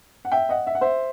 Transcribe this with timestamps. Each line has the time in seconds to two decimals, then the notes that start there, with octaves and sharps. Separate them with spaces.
0.25 F#5
0.32 E5 G5
0.49 D#5 F#5
0.67 E5
0.75 F#5
0.81 C5 E5